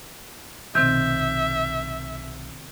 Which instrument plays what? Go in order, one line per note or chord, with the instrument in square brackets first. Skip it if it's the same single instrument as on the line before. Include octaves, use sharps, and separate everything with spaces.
[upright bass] B1 A2 [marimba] C3 D#3 C4 [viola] E5 [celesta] G6